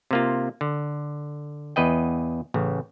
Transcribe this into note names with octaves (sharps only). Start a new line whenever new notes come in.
C3 A#3 F4
D3
E2 B4 D#5 G5
A1 C#3